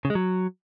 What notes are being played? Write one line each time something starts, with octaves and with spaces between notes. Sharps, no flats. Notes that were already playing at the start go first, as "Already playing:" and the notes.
C#3
G#3
F#3